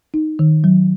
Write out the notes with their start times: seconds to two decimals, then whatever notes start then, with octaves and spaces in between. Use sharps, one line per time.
0.14 D#4
0.39 D#3
0.64 F#3